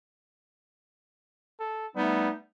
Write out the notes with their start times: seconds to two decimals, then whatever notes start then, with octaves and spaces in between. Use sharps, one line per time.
1.60 A4
1.97 G3 A3 B3 D#4